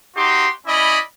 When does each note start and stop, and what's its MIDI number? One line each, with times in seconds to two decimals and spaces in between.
0.15 0.47 63
0.15 0.47 66
0.15 0.47 67
0.15 0.47 84
0.66 0.97 61
0.66 0.97 64
0.66 0.97 74
0.66 0.97 75
0.66 0.97 83